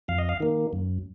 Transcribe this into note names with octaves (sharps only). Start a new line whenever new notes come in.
F2 F5
D#5
F5
D#3 A#3
F#2